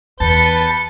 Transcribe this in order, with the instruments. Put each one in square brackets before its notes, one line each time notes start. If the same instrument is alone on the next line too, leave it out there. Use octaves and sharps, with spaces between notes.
[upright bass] E2 [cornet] B4 [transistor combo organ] A5 [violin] G6 C#7